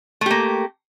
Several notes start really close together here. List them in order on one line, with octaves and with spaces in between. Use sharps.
A3 G4 A#3